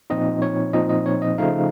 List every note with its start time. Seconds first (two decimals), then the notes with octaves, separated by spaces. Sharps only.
0.10 A#2 F3 C4 D#4 D#5
0.42 C#5
0.73 A#2 F3 C4 D#4 D#5
0.89 D#5
1.06 C#5
1.22 D#5
1.38 C#3 F3 A3 D#4 F5